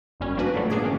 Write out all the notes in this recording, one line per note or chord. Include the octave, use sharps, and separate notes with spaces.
G1 F#2 G3 C#4
F3 A#3 D4 F#4 B4
A#2 D3 F#3 G3 A3
G2 A#3 D4 G#4 D6 G#6
E3 A3 B3 C#4